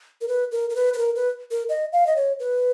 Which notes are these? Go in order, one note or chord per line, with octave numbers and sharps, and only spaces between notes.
A#4
B4
A#4
A#4
B4
B4
A#4
B4
A#4
D#5
F5
D#5
C#5
B4